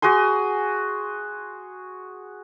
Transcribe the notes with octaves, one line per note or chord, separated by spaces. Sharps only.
F#4 G#4 G#5 C6